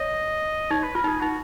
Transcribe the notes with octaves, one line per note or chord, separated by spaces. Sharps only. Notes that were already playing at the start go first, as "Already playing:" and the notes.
Already playing: C#5 D#5
D#4 C#5
B4
F4 A#4
D#4 G#4
D#4 F#4